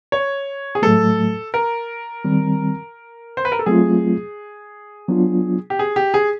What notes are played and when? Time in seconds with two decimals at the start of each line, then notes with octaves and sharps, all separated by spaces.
0.12 C#5
0.75 G#4
0.82 A2 F#3 A3 A4
1.54 A#4
2.25 D#3 G3 C4
3.37 C5
3.45 B4
3.52 A#4
3.59 A4
3.66 F#3 A3 C4 F4 G#4
5.09 F#3 B3 D4 F4
5.70 G4
5.79 G#4
5.96 G4
6.14 G#4